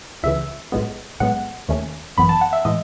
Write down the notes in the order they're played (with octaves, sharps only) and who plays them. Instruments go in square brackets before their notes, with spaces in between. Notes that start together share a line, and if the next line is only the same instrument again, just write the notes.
[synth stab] C#2 C#3 E3 E5
B1 A2 G#3 B3
B1 A2 G#3 B3 F#5
D#2 D#3 A3 C#4
G#1 F#2 E3 B3 B5
A5
F#5
E5
A2 E3 G#3 D#5